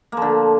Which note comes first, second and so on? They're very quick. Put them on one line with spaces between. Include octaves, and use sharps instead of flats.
A#3 F3 D3